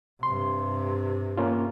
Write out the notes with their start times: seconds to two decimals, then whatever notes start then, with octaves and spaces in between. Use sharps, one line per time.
0.23 G2 C3 C6
1.37 A#3 C#4 F4